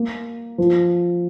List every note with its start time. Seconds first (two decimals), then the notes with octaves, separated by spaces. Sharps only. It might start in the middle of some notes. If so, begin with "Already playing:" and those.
Already playing: A#3
0.58 F3